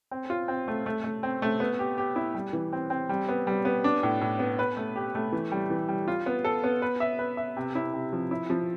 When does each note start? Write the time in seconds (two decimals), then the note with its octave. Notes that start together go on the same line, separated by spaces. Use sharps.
0.11 C4
0.30 F4
0.48 C4
0.68 A3
0.86 A3
1.04 A3
1.23 C4
1.42 A3
1.60 B3
1.79 G4
1.98 G4
2.16 E4
2.35 G3
2.53 E3
2.73 C4
2.90 C4
3.09 G3
3.29 B3
3.47 G3
3.65 B3
3.84 D4
4.03 A2
4.21 A2
4.39 B3
4.59 B4
4.77 A3
4.96 G4
5.15 A3
5.32 E3
5.52 G3
5.70 E3
5.88 G3
6.08 F4
6.26 B3
6.44 A4
6.64 B3
6.82 B4
7.00 E5
7.19 B4
7.37 E5
7.57 C3
7.75 E4
7.93 C3
8.13 F3
8.31 E4
8.50 F3